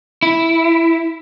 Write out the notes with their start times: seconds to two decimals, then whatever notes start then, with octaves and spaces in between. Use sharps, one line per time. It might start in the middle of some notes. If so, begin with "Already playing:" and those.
0.23 E4